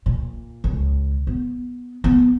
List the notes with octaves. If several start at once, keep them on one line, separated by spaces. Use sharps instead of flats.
A#2
C#2
B3
B3